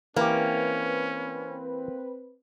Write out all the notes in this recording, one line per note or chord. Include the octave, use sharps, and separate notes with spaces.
E3 A#3 C4 C#4 G4 B4